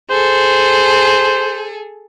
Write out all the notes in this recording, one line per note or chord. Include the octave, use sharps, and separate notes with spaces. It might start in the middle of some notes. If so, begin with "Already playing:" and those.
G#4 A4 C5